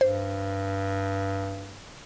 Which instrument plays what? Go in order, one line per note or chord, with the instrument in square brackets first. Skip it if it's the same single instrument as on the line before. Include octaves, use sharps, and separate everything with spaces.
[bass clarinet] G2 [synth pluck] C5